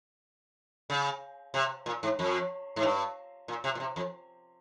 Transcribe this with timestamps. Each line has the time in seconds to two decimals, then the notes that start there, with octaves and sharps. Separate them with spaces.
0.90 C#3
1.54 C3
1.86 A#2
2.03 G#2
2.19 F2
2.76 G#2
2.83 G2
3.48 A#2
3.64 C3
3.75 A#2
3.80 C3
3.96 F2